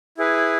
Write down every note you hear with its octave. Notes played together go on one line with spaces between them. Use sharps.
E4 G#4 B4